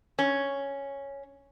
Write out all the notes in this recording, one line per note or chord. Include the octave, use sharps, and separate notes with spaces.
C#4